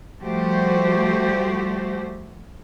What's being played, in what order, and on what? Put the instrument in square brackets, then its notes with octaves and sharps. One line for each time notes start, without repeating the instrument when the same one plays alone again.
[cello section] F3 G3 A3 F#4 G4 C5